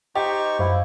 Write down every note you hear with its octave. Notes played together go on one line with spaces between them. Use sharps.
D#4 G4 C5 D#5 C#6
F#2 E4 C5 F5